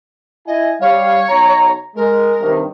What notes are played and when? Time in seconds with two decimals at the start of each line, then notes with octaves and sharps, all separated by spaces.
0.47 E4 D#5 G#5
0.81 G3 C#5 F5
1.28 B1 A#5
1.96 G#3 A#4
2.40 G2 C3 D#3